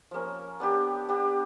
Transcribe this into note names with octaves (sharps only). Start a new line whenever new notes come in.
F3 A#3 C#4
B3 D4 G4
B3 D4 G4